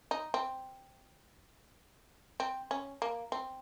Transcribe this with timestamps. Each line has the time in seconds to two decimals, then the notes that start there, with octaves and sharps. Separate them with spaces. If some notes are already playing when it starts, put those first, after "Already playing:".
0.11 D#4
0.34 C4
2.40 C4
2.71 C#4
3.02 A#3
3.32 C4